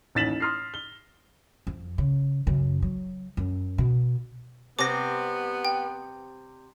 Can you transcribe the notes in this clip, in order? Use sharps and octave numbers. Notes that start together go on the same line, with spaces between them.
A1 D#2 A6 B6 E7 F#7
C6 D#6 F6 A#6 C7
G7
F2
C#3
F#2 C#3
F#3
F#2
B2
C3 G3 B3 C4 D6 A#6
G5